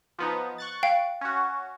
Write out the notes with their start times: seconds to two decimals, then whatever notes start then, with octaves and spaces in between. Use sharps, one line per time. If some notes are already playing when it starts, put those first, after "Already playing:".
0.19 F3 B3 D#4
0.58 C#6 F#6 A6
0.83 F5 G5
1.21 C#4 F#4